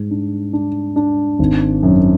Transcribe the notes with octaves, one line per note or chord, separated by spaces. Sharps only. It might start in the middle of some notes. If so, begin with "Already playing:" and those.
Already playing: G#2
D4
D4
D4
G#1
F#2